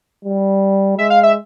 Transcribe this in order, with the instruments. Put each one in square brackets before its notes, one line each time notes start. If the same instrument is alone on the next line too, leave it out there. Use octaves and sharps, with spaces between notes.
[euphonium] G3
[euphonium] G#3 [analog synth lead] E5
[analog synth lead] F5
E5